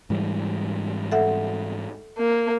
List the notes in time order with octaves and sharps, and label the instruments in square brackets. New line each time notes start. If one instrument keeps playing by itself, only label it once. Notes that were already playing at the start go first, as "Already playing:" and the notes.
[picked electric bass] G#2 E3 G3
[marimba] A4 E5 F#5
[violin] A#3